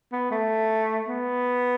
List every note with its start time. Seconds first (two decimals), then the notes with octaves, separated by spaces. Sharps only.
0.12 B3
0.31 A3
1.08 B3